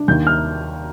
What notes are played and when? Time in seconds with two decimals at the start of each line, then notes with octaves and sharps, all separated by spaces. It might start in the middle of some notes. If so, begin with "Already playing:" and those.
Already playing: D4
0.08 D#2 G6
0.27 F6